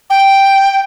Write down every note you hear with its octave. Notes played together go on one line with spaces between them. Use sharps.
G5